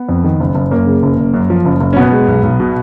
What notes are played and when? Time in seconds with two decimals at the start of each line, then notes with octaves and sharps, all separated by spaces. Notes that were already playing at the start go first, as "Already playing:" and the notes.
Already playing: B3
0.09 F2
0.24 D#3
0.40 F#1
0.55 F#1
0.71 F#2 A#3
0.86 C#3
1.03 F#1
1.17 F#1
1.34 F#2
1.50 F3
1.65 F#1
1.80 F#1
1.93 C#4
1.96 B2 B3
2.12 G#3
2.28 B1
2.43 B1
2.60 B2